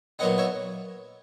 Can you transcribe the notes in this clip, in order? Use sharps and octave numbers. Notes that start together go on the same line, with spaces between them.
A#2 F#3 B3 D#4 D#5 F#5
C#5 E5